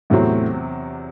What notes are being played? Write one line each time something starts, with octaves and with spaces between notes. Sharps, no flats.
E2 A2 C3 F#3 A3 C4